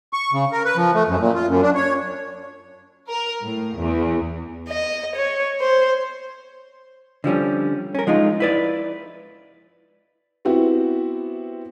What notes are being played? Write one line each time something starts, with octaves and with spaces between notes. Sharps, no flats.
C#6
C#3
A#4
B4
F3
A3
F#2
A#2
F4
F#2
D4
C#5
A#4
A2
E2
D#5
C#5
C5
D3 F3 G3 C#4
C#4 A#4
F3 G#3 D#4 F4
E4 B4 D5
B3 C4 E4 F#4 G4